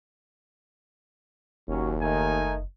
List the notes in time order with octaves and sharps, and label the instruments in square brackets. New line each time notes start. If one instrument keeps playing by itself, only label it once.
[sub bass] F#1 [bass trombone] D#2 [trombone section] F#3 C#4
[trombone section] D#3 A3 D#4 [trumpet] G#5